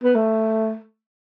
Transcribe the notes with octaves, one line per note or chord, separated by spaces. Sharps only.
B3
A3